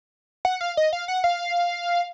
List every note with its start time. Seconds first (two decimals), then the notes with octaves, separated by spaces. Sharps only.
0.45 F#5
0.61 F5
0.77 D#5
0.93 F5
1.08 F#5
1.24 F5